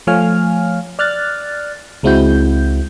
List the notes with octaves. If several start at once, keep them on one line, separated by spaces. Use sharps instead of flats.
F3 A3 C#5 F5 G#5 F6
D5 F6 F#6 A6
C#2 G#3 C4 E4 F#4 G6